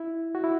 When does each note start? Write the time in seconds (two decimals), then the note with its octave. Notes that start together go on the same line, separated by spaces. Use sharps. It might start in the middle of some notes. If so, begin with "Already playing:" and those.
Already playing: E4
0.35 F#4
0.44 E4